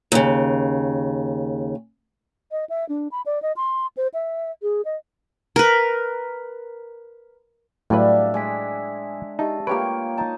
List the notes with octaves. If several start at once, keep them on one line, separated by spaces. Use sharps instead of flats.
D#2 C#3
D#5
E5
D4
B5
D5
D#5
C6
C5
E5
G#4
D#5
A#4 B4
A2 F#3 G3 D4 B4 D5 E5 F5
G#3 D5 G#5 B6
D#4 G4 E5 A5
A#3 F4 G4 B4 C#5 G5 D7
D#4 A5